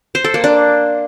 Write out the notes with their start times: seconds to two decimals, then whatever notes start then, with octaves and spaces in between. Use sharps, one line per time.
0.15 C5
0.24 A4
0.34 A#3
0.44 D4